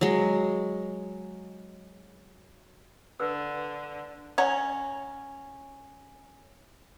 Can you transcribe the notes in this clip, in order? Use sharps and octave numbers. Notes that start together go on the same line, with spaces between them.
F#3 G#3
D3 B4 E6
C#4 C#5 F#5 A#5